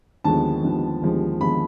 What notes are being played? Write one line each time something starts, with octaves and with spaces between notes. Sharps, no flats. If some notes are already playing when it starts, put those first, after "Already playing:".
D#2 D3 F3 G#3 B3 A5
D#2 D3 F3 G#3 B3
D#2 D3 F3 G#3 B3
D#2 D3 F3 G#3 B3 B5